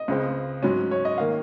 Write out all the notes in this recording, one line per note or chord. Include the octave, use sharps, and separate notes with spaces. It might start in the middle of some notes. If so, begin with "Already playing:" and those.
Already playing: D#5
C#2 C#3 G#3 C4
G#2 F#3 C#4
C#5
D#5
D#3 A#3 F5